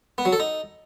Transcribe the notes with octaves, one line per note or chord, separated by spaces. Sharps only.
B3
F#3
A4
D#4